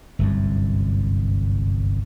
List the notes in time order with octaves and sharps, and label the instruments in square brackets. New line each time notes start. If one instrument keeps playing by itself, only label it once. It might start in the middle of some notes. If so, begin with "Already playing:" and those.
[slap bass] G1 C2 F#2